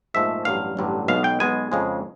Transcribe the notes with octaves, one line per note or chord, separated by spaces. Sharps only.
A#1 G#2 F3 A3 E5
A1 G2 D3 F#3 F5
A1 G2 D3 F#3
B1 B2 G#3 B3 F5
G5
B1 B2 G#3 B3 G#5
F2 C#3 F3 G#3